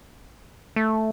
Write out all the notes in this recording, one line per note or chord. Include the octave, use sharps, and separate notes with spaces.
A3